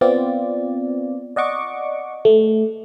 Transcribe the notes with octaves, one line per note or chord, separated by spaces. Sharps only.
B3 C4 F4 D5
D5 D#5 F#5 C#6 D6
A3